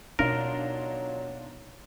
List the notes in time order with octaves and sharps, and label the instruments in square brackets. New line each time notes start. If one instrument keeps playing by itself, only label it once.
[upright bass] B2 [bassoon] F#3 [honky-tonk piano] D4 D#4 F4 [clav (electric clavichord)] A#4